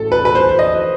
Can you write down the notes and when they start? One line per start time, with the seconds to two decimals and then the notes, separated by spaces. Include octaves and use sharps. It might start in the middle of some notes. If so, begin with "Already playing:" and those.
Already playing: A1 A2 A4
0.12 B4
0.25 B4
0.35 C5
0.49 C5
0.59 D#5